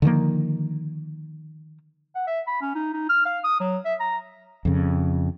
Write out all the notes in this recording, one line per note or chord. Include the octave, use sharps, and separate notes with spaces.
D3 D#3 F3 A#3
F#5
E5
B5
C#4
D#4
D#4
F6
F5
D#6
F#3
E5
A#5
F2 C#3